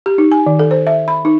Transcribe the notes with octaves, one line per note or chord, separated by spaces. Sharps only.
G4
D#4
G#5
D#3
A4
C5
E5
B5
D#4